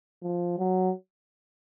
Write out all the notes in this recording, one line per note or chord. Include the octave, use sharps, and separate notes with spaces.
F3
F#3